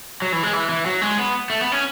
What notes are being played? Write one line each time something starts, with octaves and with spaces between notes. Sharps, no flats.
F#3
E3
G#3
E3
E3
F#3
G#3
B3
A3
B3
C#4